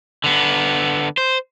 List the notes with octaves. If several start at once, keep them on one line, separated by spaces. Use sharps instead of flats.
D3 B3
C5